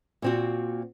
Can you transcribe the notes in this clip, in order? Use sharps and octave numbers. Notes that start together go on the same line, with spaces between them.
A#2 C4 F#4